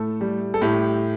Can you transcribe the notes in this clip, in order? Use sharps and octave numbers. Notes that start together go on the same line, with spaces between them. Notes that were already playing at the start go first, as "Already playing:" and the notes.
Already playing: A2 A3 A4
G3
A4
A2 G4